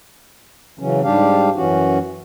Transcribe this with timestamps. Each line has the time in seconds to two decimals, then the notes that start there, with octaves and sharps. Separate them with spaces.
0.79 C#3 E3 F#3 C#4
1.03 G#2 G3 D4 G4 F5
1.56 F#2 E3 C#4 F#4